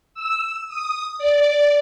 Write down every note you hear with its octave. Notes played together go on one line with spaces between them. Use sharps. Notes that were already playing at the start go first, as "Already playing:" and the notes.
E6
D#6
D5